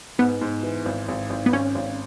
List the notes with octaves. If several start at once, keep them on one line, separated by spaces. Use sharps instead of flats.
G#2 B3
G#2
E3
G#1
G#1
G#1
B3
G#1 C#4
G#1